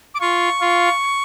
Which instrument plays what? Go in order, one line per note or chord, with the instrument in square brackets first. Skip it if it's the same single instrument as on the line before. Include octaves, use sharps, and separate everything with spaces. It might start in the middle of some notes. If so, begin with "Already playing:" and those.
[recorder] D6
[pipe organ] F4 [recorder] C#6
[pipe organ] F4